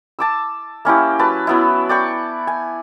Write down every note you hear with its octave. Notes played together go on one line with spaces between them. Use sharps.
A5 D6 E6
A#3 C#4 E4 G4
F#3 B4 A5
F#3 B3 E4
D5 G5 C#6
G#5